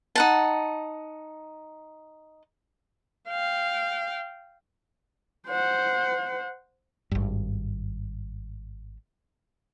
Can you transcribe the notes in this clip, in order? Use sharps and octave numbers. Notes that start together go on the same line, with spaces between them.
D#4 F#5 A5
F5 G5
C5 F#5
G#1 G2